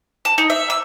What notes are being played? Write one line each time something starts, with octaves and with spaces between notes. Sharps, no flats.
A5
D#4
E5
E6